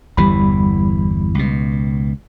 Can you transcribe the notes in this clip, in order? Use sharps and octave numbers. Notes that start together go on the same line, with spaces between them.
G1 E2 E3 G3 B5
C#2 B2